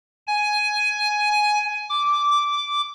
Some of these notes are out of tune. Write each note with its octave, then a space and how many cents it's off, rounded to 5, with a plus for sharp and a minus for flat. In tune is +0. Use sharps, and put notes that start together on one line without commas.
G#5 +10
D6 -5